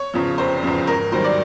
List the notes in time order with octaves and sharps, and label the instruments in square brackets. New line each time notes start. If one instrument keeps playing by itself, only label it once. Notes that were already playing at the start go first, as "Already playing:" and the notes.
Already playing: [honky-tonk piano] C#5
E2 C#3 F3
F1 C5
E2 C#3 F3
G#1 A#4
G2 D#3 F#3 C5
D5